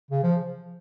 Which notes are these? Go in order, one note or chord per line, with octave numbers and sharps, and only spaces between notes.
C#3
F3